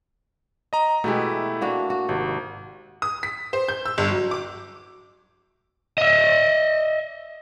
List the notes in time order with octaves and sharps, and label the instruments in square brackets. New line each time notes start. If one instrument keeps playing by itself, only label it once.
[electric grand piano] D#5 A#5
[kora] B2 E3 G#3 [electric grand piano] A3 E4 G4
[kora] A#3 D4 F#4
F#4
[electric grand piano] G#1 [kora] C3
[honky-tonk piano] D#6
B6
C5
G6
E6
G1
F#3
D6
[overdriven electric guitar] D#5 E5